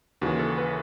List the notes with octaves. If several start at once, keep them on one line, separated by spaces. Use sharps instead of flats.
D#2 C#3 E3 F#4
A4
B4